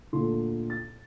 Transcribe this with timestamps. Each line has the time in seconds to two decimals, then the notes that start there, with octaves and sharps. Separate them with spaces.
0.13 D2 A#2 A4 C6
0.70 A6